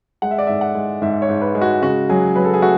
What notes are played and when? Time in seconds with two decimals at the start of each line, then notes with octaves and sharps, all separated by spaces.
0.22 G#3 F#5
0.31 E5
0.38 D5
0.47 G#2 E5
0.61 F#5
0.75 G#3
1.02 G#2 E5
1.22 C#5
1.29 G#2
1.41 B4
1.55 G#3
1.61 F#4
1.82 C#3 F#4
2.09 F#3 G#4
2.36 F#3 B4
2.45 A4
2.54 G#4
2.62 A3 F#4